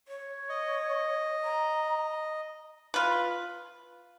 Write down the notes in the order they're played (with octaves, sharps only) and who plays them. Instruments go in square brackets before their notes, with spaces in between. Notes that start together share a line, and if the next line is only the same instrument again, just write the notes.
[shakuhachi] C#5
[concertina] D#5
[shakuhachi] A#5
[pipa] F4 B4